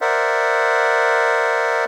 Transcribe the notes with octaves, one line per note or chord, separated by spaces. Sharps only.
A#4 C5 D5 E5 F#5